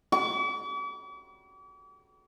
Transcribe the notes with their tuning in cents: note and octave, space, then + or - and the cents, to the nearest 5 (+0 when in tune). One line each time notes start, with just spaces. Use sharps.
D6 -45